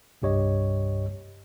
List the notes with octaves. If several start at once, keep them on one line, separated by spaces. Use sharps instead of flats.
C2 G2 G4 C#5 D#5